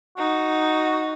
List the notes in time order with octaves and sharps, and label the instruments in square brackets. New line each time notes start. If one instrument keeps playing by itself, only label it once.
[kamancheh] D#4 [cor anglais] F#4